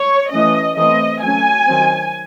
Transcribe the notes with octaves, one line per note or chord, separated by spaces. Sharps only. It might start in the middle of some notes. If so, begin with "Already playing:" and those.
Already playing: C#5
E3 A3 C#4 D#5
E3 A3 C4 D#5
F#3 A3 C#4 G#5
D#3 F#3 C4